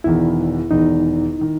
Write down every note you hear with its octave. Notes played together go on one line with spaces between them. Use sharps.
E1 E2 D#3 E4
E1 E2 D#3 D#4
D#3